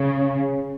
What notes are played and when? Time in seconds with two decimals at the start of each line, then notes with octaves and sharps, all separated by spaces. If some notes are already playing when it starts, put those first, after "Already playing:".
Already playing: C#3